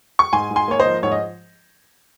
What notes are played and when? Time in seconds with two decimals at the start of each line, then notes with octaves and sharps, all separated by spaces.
0.19 C#6
0.33 G#2 G#5 C6
0.51 G#2
0.56 G#5 C6
0.68 A#3 C#5
0.80 C5 D#5
0.86 F3
1.03 G#2 C#5
1.12 D#5